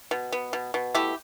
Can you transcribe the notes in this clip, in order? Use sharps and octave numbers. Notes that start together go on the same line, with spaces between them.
B2
B3
B2
B2
A3 E4 G4